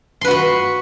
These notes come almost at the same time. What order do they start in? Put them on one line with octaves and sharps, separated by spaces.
C6 B4 F#4 B5